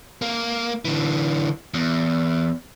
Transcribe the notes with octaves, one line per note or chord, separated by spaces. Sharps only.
A#3
D3 E3
E2